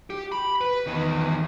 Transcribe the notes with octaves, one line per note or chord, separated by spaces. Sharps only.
G4
B5
B4
E2 D#3